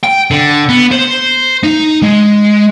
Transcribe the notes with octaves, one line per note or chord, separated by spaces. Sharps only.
G5
D3
B3
C5
D#4
G#3